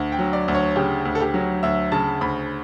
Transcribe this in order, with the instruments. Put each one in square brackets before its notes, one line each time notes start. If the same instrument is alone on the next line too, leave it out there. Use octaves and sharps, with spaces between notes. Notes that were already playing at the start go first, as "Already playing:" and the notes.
Already playing: [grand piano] D2
G5
F#3
D5
D2
C#5
C#3 G4
D2
A4
G4
F#3
D2 E5
C#3 A5
D2 B5